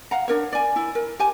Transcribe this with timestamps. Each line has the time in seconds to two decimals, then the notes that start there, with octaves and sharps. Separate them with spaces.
0.11 F5 F#5 A#5
0.28 D4 A#4 C#5
0.52 D5 G#5
0.76 E4
0.95 A#4
1.19 G4 G#5